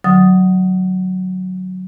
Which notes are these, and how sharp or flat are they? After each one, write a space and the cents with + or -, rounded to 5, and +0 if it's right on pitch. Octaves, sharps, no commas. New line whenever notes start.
D3 +30 F#3 +0 D#6 +0